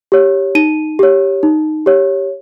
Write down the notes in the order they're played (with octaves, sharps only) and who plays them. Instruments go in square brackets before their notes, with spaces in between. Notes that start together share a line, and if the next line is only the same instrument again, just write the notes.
[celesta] G4 C#5
D#4 D#7
G4 C#5
D#4
G4 C#5